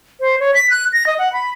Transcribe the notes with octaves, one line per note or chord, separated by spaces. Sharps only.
C5
C#5
B6
F#6
A#6
D#5
F#5
B5